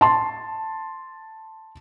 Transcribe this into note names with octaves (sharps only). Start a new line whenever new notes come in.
A5 C6